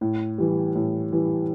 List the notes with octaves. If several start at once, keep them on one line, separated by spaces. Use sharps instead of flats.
A2
E3 G3
A2
E3 G3